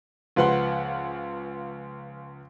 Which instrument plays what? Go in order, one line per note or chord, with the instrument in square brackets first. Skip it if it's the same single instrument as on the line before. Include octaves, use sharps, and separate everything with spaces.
[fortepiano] C#2 F3 B4 F#5 C6